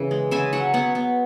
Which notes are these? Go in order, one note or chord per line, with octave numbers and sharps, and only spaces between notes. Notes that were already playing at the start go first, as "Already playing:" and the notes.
Already playing: C#3 E3
G#3
C#3 E5 G#5
F#3 C#5 F#5
B3 C#5 F#5
B3